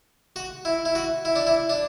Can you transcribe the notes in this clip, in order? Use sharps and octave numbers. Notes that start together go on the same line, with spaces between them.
F#4
E4
E4
F#4
E4
D4
E4
D4